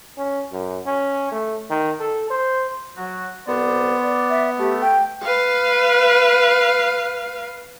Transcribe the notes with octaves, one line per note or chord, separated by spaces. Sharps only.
C#4
F#2
C#4
A3
D#3
A4
C5
F#3 F#4
C2 B3 C5 D5
D5
E5
A3 G4
G5
B4 F5